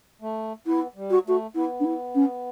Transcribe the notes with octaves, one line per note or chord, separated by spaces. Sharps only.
A3
B3 E4
G3
F#4
A3 F#4
B3 E4
D4
E4
C#4